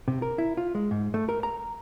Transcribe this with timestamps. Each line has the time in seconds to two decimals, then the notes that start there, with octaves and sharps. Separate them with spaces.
0.08 C3
0.22 A#4
0.38 E4
0.57 F4
0.75 G#3
0.91 G#2
1.14 A3
1.29 A#4
1.43 A#5